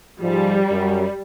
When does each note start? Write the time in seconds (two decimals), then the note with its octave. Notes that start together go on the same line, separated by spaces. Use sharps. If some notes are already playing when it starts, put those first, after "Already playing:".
0.21 G#2 F3 G3
0.70 F#2